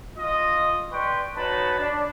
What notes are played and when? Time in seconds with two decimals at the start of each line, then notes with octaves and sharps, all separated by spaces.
0.17 F4 D#5
0.91 B4 D5 G5 C6 C#6
1.37 D#4 F#4 B4 C#5 A5 B5
1.79 D4